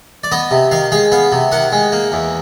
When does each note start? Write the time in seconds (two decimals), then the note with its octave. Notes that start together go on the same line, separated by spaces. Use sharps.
0.24 D5
0.32 B3 D#5
0.51 C3
0.71 D#3 F5
0.92 G#3 F5
1.12 B3 F5
1.32 C3
1.52 D#3 F#5
1.72 G#3
1.92 A#3
2.12 E2